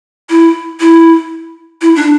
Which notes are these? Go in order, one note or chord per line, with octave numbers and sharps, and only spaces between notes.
E4
E4
E4
D4